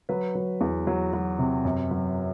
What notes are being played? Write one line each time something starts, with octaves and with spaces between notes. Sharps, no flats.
F#3 B4
F#3
E2
F#3
F#3
C3
F#2
F#3